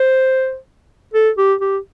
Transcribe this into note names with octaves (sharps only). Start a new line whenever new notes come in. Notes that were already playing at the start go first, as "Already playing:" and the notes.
Already playing: C5
A4
G4
G4